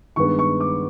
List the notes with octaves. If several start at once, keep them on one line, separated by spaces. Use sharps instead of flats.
G2 D#3 G#3 B3 C#6
C#6
D6